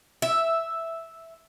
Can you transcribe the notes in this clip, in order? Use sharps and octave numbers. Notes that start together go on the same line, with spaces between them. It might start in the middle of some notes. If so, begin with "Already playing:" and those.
E5